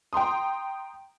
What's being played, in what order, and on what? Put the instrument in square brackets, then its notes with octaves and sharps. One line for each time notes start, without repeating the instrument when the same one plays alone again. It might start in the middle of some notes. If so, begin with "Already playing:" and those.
[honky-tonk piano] G5 A#5 C6 D#6